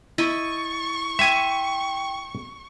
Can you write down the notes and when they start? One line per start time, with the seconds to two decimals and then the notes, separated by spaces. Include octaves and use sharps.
0.18 E4 D#5 C#6 A6
1.19 E5 G5 G#5 C6